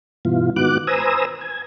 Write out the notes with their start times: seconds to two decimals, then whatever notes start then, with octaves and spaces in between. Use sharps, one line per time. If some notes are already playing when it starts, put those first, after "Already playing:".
0.25 G2 B2 E3 F4
0.56 G#2 D#3 B3 F#4 D6 F#6
0.87 B4 C5 G#5 A#5 D#6 E6
1.41 G#5